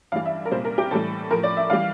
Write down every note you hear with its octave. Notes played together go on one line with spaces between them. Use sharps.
G2 E3 G3 F5
E5
A#4
C2 A#2 G3 C5
A#4
G4
A2 E3 G3 A4
A2 F3 A#4
D5
E5
E3 G3 F5